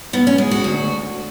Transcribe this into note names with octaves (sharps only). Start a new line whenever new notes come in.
G#2 B3
C#4
G#3
F#4
D2